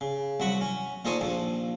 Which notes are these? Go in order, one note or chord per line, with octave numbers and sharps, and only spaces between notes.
C#3
C2 F#3 F#4 B5 C#6
C#4
A#2 D#4 A4 C5 G#5 C#6
A#1 D#2 F3